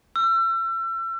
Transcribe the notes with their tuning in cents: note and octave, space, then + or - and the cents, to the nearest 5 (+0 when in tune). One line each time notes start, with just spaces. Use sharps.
E6 +35